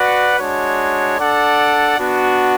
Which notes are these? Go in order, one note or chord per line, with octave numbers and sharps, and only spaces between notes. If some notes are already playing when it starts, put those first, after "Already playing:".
Already playing: F#4 B4 D5 F#5
G#3 D4 F#4 C#5
D4 A4 D5 F#5
B3 D4 F#4